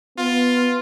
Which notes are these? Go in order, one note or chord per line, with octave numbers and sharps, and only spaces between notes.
B3 F4